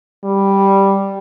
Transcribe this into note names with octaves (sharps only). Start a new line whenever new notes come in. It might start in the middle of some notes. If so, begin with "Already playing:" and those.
G3